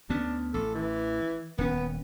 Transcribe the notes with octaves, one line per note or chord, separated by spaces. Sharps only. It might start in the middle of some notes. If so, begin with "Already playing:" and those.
D2 B3 C#4 D4
A1 A4
E3
D#1 B3 C#4